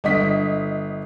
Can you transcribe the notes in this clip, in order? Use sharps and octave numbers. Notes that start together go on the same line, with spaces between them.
G1 D#5 B6